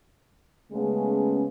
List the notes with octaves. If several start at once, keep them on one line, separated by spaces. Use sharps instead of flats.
C#3 G#3 A3 B3 C#4